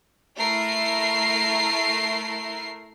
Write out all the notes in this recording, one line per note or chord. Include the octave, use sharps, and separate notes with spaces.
A3 E4 A#4 C7